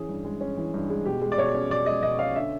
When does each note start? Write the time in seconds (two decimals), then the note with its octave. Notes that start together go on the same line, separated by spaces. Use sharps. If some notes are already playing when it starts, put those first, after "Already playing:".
Already playing: E3 C#4 G#4
0.09 G2
0.25 G#3
0.41 C#4
0.57 E3
0.74 G2
0.90 G#3
1.06 B2 G4
1.22 G#3
1.32 D5
1.38 B2 C#5
1.54 C#4
1.70 B2 D5
1.86 G#3 D#5
2.03 B2 D#5
2.19 C#4 F5
2.36 D3 E5